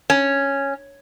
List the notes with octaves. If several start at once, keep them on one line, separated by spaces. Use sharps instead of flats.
C#4